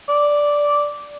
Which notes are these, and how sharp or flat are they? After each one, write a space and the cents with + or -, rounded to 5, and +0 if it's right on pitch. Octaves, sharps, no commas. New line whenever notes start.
D5 -5